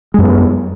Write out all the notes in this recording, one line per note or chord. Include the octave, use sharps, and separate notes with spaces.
F#2 G#3 B3